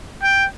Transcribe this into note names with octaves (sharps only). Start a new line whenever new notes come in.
G5